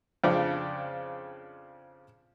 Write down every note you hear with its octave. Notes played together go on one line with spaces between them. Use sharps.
F2 C#3 C4 D4